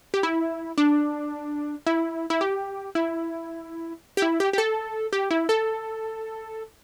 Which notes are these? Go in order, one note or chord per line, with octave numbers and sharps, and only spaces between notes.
G4
E4
D4
E4
E4
G4
E4
G4
E4
G4
G4
A4
G4
E4
A4